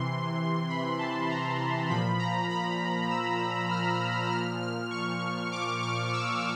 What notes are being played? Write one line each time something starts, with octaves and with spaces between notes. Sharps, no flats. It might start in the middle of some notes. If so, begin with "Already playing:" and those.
Already playing: C3 E3 C6
B5
A5
A#5
A#2 F3 B5
A#5
B5
E6
F6
A#2 F3 F6
F6
C#6
D6
F6
E6